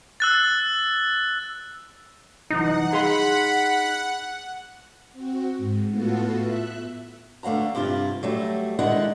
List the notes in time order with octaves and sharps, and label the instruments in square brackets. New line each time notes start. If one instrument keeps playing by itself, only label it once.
[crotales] E6 F#6 A6
[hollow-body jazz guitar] C2 F#2 E3 [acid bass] D#4 [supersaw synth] F#5
[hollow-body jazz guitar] G#4 F5 C6 [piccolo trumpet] B5
[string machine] C4 F#4
G#2
A2 B3 F4 F#4 A4
E5 F#6
[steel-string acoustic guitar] D3 A3 F5 F#5 A#5
G2 C3 E4 F4
F#3 G3 A3
D3 D#3 G#3 E4 F#5